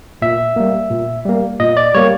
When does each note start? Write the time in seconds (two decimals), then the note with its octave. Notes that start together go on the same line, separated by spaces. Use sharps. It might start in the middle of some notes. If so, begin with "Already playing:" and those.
0.22 A#2 E5
0.56 G3 A#3
0.90 A#2
1.25 G3 A#3
1.60 A#2 D#5
1.77 D5
1.95 G3 A#3 C#5